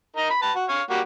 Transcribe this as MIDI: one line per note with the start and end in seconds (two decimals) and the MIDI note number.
0.16 0.30 63
0.16 0.30 70
0.16 0.30 75
0.30 0.40 83
0.42 0.52 71
0.42 0.52 81
0.56 0.65 66
0.69 0.82 73
0.69 0.82 77
0.90 1.00 55
0.90 1.00 58
0.90 1.00 66